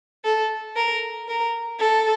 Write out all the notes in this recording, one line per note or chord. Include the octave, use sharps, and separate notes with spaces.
A4
A#4
A#4
A4